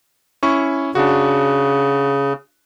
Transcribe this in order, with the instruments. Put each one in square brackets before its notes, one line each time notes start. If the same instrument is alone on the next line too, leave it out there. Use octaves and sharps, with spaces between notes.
[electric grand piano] C#4 E4 C#6
[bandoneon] C#3 [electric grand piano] D4 F#4